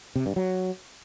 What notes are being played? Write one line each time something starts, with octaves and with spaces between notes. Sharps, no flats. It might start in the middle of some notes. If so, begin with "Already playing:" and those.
C3
G2
F#3